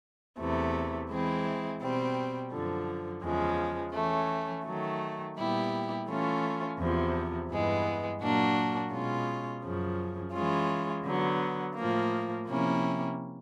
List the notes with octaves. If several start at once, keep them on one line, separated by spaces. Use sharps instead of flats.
E2 C3 E3 A3
E3 G#3 C4 E4
B2 G3 C4
F#2 D3 F3
E2 C#3 F3 G#3
E3 A3 C#4
D#3 F#3 A3
A#2 G3 B3 E4 G4
E3 A3 C#4 F4
E2 C3 F3
G2 E3 G#3 B3
A#2 F#3 A#3 D4 F#4
B2 G#3 C#4 F4
F#2 C#3 F3
E3 G#3 C#4 F4
D3 F#3 B3
A2 F3 A#3
C3 F3 A#3 C#4 E4